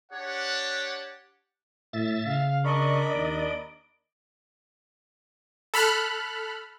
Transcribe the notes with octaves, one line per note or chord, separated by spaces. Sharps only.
D4 G4 C#5 F#5
A2 E5 A6
C#3 F5
D4 A#4 D5 D#5 B5 C#6
D#2 D7
A4 B5 F6 F#6